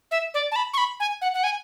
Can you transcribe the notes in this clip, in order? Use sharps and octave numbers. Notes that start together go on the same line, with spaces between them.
E5
D5
A5
B5
C#6
B5
G#5
F#5
F#5
G#5